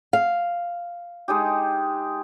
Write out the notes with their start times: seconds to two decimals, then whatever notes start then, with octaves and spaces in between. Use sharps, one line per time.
0.13 F5
1.28 G#3 D#4 G4